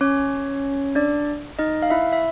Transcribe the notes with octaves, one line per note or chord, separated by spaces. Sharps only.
C#4 C#5
D4 D5
D#4 D#5
F5
E4 E5
E5